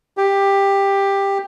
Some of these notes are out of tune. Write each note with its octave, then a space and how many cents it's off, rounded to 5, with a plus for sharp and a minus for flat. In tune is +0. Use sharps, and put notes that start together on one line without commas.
G4 +10